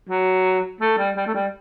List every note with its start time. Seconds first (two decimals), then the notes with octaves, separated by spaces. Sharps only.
0.09 F#3
0.81 A3
0.98 G3
1.16 G3
1.27 A3
1.34 G3